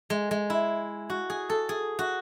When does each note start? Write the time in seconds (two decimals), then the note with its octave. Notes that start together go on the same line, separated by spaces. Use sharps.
0.10 G#3
0.31 G#3
0.50 E4
1.10 F#4
1.30 G#4
1.50 A4
1.69 G#4
1.99 F#4